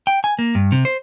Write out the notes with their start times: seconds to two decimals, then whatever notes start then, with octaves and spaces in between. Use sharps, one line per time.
0.07 G5
0.24 G#5
0.39 A#3
0.55 G2
0.72 C3
0.85 C5